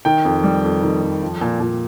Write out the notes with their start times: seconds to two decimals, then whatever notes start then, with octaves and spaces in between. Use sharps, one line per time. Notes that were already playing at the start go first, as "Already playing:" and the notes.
0.05 D#3 G5
0.25 F2
0.44 G3
0.64 F2
0.83 D#3
1.02 F2
1.23 F3
1.41 A#2
1.60 A#2